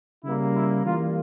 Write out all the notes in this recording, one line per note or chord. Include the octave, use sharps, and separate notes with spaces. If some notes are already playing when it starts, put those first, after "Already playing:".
C#3 G3 A#3 E4
E4
E3 G3 A#3 F4